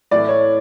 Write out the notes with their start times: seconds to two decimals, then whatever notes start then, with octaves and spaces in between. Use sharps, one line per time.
0.11 A2 E3 D5
0.29 C#5